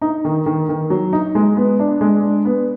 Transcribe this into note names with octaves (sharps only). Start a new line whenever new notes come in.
D#4
D#3
D#3
D#3
F#3
D#4
G#3
B3
D4
G#3
D4
B3